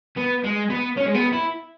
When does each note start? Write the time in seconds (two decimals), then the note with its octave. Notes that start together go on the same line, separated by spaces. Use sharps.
0.17 B3
0.44 G#3
0.70 B3
0.97 C#4
1.06 G#3
1.15 B3
1.33 E4